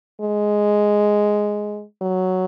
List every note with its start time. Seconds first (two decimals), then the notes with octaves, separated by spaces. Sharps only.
0.21 G#3
2.02 F#3